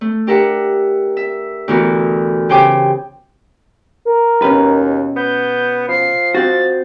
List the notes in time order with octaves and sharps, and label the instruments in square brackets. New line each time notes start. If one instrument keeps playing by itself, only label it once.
[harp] A3
D4 G4 A#4 E5 F#5
E5
D2 B2 E3 F#4 A#4
C#3 G4 C5 G5 G#5 D6
[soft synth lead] A#4
[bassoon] D#2 [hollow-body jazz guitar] B2 C#4 B4
[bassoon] B3 [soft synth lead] G6
[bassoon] F3 [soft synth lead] C7
[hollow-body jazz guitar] C4 F#4 [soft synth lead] A6